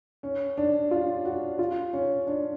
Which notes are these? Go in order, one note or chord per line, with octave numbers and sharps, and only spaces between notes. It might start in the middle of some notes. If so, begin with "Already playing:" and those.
C#4
D4
F4
F#4
F4
C#4
D4